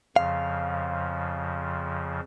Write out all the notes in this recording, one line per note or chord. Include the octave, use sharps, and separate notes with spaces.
F2 C#3 F3 F5